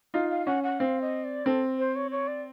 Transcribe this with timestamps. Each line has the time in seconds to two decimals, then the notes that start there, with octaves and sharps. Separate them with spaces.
0.14 D#4 F4 F5
0.30 F5
0.46 C#4 F#5
0.64 F#5
0.79 C4 F5
1.01 D#5
1.24 D5
1.46 C4 A4
1.79 C5
1.96 C#5
2.11 C#5
2.28 D5